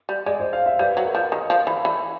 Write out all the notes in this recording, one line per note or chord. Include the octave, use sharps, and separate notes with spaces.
G3
G#3 D5
C5
F5
E5
C5
G3 B4
F#3
A#4
F3
D#3
F3
E3
E3